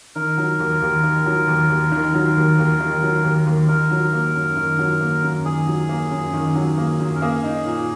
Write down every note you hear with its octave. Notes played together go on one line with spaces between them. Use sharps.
D#3 A#4
F#3
D#2
D#2
D#3
F#3
D#2
D#2
D#3
F#3
D#2
D#2
D#3
F#3
D#2
D#2
D#3 A#4
F#3
A#3
F#2
D#3
F#3
A#3
F#2
D#3 G#4
F#3
A#3
F#2
D#3
F#3
A#3
F#2
A#4
A#3 G#4
D#4
A#2